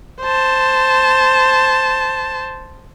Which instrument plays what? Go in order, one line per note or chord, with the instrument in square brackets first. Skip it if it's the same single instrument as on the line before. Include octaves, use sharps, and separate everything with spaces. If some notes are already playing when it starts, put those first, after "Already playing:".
[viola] C5 A5